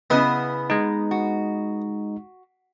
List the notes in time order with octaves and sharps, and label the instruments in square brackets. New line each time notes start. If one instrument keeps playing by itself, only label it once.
[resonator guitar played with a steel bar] C#3 E4 D#5 [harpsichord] B3
[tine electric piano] G#3 D#4
[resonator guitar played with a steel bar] F#4